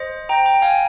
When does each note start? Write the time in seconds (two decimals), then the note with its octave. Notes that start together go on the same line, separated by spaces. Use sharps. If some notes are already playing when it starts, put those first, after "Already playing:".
Already playing: C5 D#5
0.29 G5 A#5
0.46 G5 A#5
0.62 F5 G#5